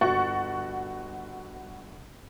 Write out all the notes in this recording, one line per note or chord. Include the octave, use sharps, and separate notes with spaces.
G1 F#4 F#5 C#6 A6